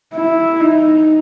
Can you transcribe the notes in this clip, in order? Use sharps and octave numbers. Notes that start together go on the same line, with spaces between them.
E4
D#4